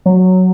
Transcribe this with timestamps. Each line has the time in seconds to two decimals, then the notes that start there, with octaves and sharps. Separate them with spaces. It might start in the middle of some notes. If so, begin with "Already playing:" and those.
0.06 F#3